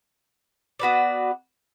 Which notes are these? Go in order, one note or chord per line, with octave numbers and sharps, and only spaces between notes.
B3 F#4 B4 D5